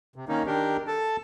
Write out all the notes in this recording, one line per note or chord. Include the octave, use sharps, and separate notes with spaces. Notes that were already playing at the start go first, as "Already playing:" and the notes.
C3
D#3 A#3 C#4 D#4
D#3 D4 G4 A#4
A4 A5